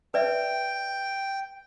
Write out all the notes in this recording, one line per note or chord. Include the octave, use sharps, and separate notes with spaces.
B4 D5 E5 G5